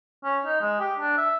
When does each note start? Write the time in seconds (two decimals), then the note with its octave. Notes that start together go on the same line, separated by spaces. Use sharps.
0.24 C#4
0.46 D#4
0.61 G#3
0.80 G4
0.99 D4
1.18 E5